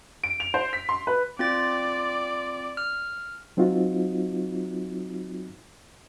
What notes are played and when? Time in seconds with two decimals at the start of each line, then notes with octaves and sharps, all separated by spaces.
0.24 D7
0.40 F7
0.54 C5
0.73 B6
0.89 C6
1.07 B4
1.39 C4 F4 D5 A6
2.77 F6
3.57 F#3 C4 D#4 F4 F#4